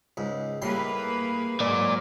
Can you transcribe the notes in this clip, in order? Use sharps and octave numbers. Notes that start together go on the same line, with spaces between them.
C#2 G#2
A2 G3 A#3 G#4 B4 C6
G#2 F#3 A#3 D5